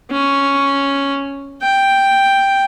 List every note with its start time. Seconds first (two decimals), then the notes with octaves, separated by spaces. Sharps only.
0.11 C#4
1.62 G5